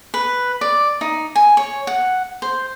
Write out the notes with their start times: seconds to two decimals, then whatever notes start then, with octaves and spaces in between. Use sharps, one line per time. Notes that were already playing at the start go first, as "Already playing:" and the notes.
0.14 B4
0.61 D5
1.01 D#4
1.36 G#5
1.57 C#5
1.87 F#5
2.42 C5